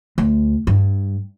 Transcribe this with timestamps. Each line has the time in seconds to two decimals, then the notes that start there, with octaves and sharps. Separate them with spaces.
0.18 D2
0.67 G2